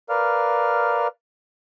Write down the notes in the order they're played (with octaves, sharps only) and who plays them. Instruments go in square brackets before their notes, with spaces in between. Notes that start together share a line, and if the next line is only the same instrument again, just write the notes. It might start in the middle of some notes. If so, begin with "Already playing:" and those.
[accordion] A#4 B4 D5 F5 F6